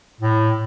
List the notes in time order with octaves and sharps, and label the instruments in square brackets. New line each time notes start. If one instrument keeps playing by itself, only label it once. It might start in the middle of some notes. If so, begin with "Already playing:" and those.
[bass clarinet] A2